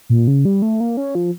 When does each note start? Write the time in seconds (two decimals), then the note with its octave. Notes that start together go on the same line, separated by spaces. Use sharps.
0.10 A#2
0.27 C#3
0.45 G3
0.62 A3
0.80 A#3
0.97 C#4
1.15 F3